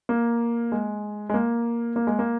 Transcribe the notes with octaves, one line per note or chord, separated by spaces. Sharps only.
A#3
G#3
G#3
A#3
A#3
G#3
A#3